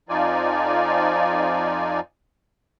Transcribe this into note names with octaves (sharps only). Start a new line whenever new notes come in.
F2 F3 D#4 F4 D5 G#5